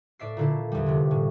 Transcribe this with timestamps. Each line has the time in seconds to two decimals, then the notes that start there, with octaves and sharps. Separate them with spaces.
0.19 A2 D5 E5 C7
0.37 A#2 D3 E4
0.72 E2 G3
0.86 F1 C3
1.11 A2